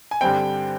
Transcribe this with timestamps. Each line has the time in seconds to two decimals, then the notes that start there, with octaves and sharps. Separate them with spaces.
0.11 G#5
0.21 G2 D3 G3 C4 G5